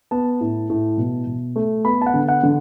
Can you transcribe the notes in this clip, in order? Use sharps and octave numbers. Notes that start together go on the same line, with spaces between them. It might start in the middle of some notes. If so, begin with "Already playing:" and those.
B3 A5
A2
A2
B2
B2
A3
B3 B5
A5
F#5
D3
F#5
D3